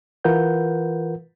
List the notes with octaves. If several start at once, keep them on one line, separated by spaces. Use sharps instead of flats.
E3 F4 A#4 B4 F#5 G6